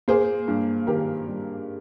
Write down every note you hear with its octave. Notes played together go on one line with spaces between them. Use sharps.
A#3 G#4 C5
G2
D#3 G4 A#4
G3